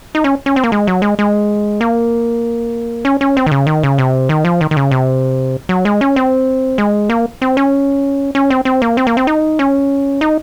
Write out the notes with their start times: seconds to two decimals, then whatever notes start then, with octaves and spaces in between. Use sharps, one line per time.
0.15 D#4
0.24 C#4
0.46 C#4
0.56 C4
0.64 A#3
0.72 G#3
0.87 F#3
1.02 G#3
1.19 G#3
1.81 A#3
3.05 C#4
3.21 C#4
3.37 C4
3.47 D#3
3.51 C#3
3.67 D#3
3.83 C#3
3.98 C3
4.29 D#3
4.45 F3
4.61 D#3
4.71 D#3
4.77 C#3
4.91 C3
5.69 F#3
5.85 G#3
6.01 C#4
6.16 C4
6.78 G#3
7.10 A#3
7.42 C4
7.57 C#4
8.35 C#4
8.50 C4
8.65 C4
8.82 A#3
8.97 C4
9.07 A#3
9.17 C4
9.27 D#4
9.59 C#4
10.21 D#4